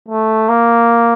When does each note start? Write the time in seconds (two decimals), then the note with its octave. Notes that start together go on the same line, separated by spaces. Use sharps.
0.08 A3
0.49 A#3